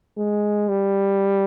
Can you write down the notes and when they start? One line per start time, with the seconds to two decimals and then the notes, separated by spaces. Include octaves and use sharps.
0.18 G#3
0.69 G3